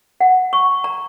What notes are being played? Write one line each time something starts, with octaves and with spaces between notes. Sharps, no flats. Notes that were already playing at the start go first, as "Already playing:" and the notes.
F#5
C#6
A#5